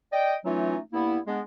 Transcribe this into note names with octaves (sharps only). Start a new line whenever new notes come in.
D5 D#5 G5
E3 F#3 A3 C#4 D#4 F4
G2 A#3 B3 E4
G#3 B3 D4